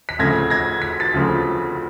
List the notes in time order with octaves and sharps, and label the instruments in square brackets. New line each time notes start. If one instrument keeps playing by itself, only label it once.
[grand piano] B6
D2 C#3 F3 A3 G#6 A#6
G#6 A#6
B6
A6 B6
D2 C#3 F3 A3